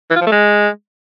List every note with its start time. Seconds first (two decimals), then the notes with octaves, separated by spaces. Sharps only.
0.10 E3
0.16 F4
0.21 F3
0.26 A3
0.32 G#3